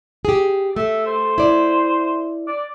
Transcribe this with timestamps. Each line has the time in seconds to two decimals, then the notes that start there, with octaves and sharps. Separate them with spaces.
0.25 G4 G#4
0.76 A3 E5
1.06 C5
1.38 E4 D5
2.47 D5